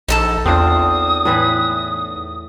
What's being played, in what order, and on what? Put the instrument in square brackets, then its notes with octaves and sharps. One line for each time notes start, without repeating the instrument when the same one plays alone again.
[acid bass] A#1 [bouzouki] D#4 A4 A5
[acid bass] E2 [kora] C4 D4 F4 [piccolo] D#6
[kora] A2 E3 B4